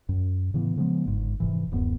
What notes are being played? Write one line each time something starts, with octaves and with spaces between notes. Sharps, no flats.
F#2
A2 C#3 E3 B3
C#3 F3 G#3 B3
G1 G#2
F1 G#2 C3 E3
D1 F#2 B3